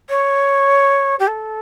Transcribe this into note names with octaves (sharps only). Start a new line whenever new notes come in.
C#5
G4
A4